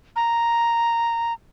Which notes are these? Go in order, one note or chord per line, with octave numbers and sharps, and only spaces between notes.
A#5